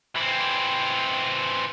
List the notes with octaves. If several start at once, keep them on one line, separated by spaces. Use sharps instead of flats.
E3 C4